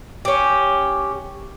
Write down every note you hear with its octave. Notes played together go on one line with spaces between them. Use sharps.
C#4 G4